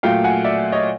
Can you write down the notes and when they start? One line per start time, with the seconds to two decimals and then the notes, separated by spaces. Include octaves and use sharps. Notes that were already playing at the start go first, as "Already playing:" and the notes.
0.03 A#2 F#3 A3 F5 G5
0.24 F#5 G#5
0.44 D5 E5
0.72 C#5 D#5